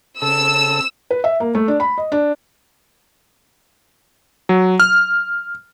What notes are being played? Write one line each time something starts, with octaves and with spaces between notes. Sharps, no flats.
C#3 A4 E6
B4
E5
A#3
A3
D4
B5
D#5
D4
F#3
F6